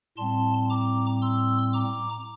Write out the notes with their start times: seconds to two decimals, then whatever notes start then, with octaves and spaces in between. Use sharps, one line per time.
0.17 A2 G3 C4 A5 C6
0.70 A#5 D6
1.22 C6 E6
1.73 A#5 D6